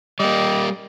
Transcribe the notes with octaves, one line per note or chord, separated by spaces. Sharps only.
G3 A#3 D5 D#5 G5